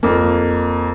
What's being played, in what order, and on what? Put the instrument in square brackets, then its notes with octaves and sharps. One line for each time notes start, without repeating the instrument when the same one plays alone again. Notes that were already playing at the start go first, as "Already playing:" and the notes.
[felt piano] F2 A#3